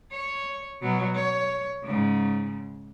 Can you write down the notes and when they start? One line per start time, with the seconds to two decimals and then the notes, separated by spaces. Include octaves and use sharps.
0.11 C#5
0.81 B2 F#3
1.15 C#5
1.84 G#2 C#3